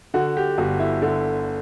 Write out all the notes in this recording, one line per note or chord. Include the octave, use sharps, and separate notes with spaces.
D3 F#4
G4
G1 F#4
E4
D3